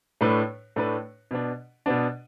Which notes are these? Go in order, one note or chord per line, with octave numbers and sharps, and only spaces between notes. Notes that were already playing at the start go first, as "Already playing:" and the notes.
A2 A3 D4 B4
A2 A3 D4 B4
B2 B3 D4
B2 B3 D4